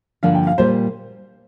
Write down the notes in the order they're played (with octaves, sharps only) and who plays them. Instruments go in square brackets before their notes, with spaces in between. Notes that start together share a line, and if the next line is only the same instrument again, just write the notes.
[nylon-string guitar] G2 D3 F3 A#3 D4 [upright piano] F5
[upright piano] G5
F5
[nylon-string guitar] A#2 G3 A#3 F4 [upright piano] C5